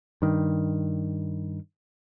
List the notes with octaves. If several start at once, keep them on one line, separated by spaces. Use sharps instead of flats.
G2 D#3